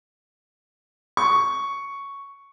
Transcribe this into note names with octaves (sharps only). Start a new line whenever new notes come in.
C#6